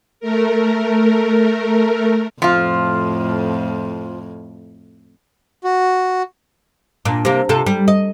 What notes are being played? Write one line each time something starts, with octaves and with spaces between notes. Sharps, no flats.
A3 A#4
F2 A2 F3 F4
F#4
A#2 D4
C3 A#3
C3 F4 A4
G3
D#5